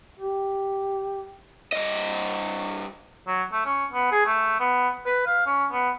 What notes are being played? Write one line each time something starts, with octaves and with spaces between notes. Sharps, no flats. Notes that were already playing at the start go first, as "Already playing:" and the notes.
G4
G2 D#5
F#3
A3
C#4
B3
G#4
A3
B3
B4
F5
C#4
B3